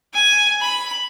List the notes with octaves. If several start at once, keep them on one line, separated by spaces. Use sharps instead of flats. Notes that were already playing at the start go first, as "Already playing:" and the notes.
G#5
B5